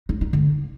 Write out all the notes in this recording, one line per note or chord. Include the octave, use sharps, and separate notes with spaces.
D#4
D#4
D3